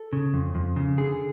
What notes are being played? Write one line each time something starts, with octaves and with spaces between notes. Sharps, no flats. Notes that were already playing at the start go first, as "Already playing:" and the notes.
Already playing: A4
C#3
F2
F2
C#3
D3 G#4